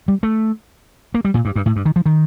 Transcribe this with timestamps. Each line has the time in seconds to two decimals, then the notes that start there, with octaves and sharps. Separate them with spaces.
0.08 G3
0.23 A3
1.14 A#3
1.25 G3
1.34 A#2
1.45 G2
1.56 G2
1.66 A2
1.76 G2
1.85 D#3
1.96 F3
2.06 D#3